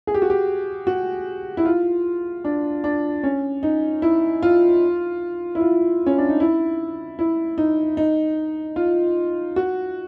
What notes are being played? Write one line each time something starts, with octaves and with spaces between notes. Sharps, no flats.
G#4
G4
F#4
G4
F#4
E4
F4
D4
D4
C#4
D#4
E4
F4
E4
F4
C#4
D4
D#4
E4
E4
D#4
D#4
F4
F#4